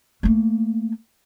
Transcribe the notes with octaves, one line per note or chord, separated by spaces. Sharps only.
A3 A#3